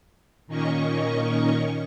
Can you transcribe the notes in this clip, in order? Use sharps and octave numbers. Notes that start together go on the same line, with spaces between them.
A#2 D#3 A#3 C#4 D#5 C#6